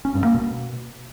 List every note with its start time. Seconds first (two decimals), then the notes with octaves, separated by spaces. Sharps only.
0.05 C#4
0.15 G2
0.24 A#3
0.34 B2